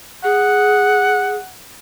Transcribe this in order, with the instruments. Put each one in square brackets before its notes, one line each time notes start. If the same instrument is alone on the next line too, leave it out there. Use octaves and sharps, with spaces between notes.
[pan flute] G#4 [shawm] F#5